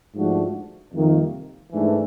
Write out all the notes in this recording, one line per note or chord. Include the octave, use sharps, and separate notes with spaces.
G#2 F3 A3 D4 F#4
F2 C3 D#3 G3 A#3
G#2 E3 A3 D4